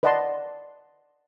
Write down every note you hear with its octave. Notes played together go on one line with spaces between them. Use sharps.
B4 D5 D#5 F#5 A5 C6